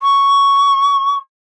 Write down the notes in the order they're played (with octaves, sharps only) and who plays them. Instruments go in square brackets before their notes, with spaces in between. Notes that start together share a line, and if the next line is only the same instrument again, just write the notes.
[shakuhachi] C#6